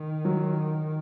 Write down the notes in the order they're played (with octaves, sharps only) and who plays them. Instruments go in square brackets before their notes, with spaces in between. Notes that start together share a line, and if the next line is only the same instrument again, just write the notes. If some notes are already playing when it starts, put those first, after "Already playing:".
Already playing: [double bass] D#3
[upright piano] F#3